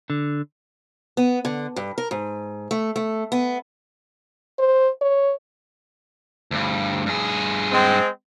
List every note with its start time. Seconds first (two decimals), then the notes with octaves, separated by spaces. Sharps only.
0.10 D3
1.17 B3
1.45 D3
1.76 G2
1.98 A#4
2.11 G#2
2.71 A3
2.96 A3
3.32 B3
4.59 C5
5.02 C#5
6.51 D2 G2
7.06 G2 G#4
7.72 G#3 C4